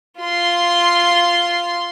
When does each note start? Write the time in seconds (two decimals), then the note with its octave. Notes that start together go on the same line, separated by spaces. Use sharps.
0.19 F4 C6